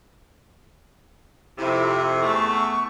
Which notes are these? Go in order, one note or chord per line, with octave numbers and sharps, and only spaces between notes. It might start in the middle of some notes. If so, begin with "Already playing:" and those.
F2 C3 E4
E2 A3 C#6